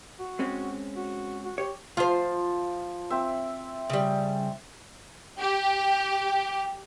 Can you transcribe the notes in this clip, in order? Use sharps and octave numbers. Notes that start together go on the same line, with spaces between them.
F#4
G#3 C4 C#4
F#4
F#4
G4 C#5
F3 F4 C5
C4 E5
C#3 G3
G4